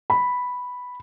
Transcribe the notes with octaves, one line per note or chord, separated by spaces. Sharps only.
B5